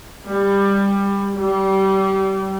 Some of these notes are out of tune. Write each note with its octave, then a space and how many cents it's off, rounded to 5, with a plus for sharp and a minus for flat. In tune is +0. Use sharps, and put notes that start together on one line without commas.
G3 +20
G3 -25